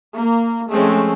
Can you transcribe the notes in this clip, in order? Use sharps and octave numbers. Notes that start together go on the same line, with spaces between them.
A#3
F3 G#3 A3 C4 C#4